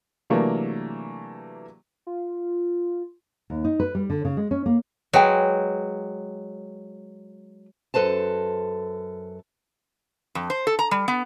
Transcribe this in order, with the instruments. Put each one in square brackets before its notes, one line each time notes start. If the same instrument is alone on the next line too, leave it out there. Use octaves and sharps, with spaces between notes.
[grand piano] C3 E3 F#3 A3 A#3 D4
[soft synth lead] F4
[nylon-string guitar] D#2
D#4
B4
G3
D3
C#3
G#3
C#4
A#3
[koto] F#3 G#3 [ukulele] B4 G5
[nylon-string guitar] F#2 A4 B4 C5 A5
[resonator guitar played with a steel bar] F2
C5
A4
A#5
G3
B3